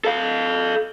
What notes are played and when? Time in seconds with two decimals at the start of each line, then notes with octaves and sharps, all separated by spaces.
0.05 A4 F5